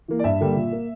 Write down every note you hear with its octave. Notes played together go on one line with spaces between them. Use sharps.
E3 A#3
D5
G2 E5
D3 G3 A#3
A#2
A#3